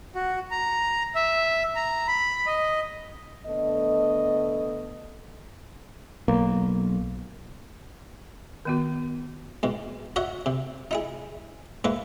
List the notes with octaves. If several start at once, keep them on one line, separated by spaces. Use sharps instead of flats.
F#4
A#5
E5
A#5
B5
D#5
D3 A3 B3 D#5
B1 A#3
D#3 B3 F#4
G#2 B2
F#4 C#5 D#5 E5 F#5
C3
D#4 E4 G#4
G#2 A#3 B4 E5